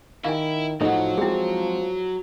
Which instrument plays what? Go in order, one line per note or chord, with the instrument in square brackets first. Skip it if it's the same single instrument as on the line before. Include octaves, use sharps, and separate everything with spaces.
[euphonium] D#3 [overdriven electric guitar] E4 [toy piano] F5 G#5
[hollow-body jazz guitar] A2 D#4 [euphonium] F3 [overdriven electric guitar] F#3 [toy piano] A4 F#5
[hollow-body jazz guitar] G#3 C4 [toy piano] E4 G#4